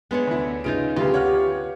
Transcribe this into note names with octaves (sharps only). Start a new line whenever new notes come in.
G#3 B3 D4 C#5
D2 E4
C#3 D#4 F4 G#4 D7
D2 C#3 F4 G4 B4
C#5 F#5 F6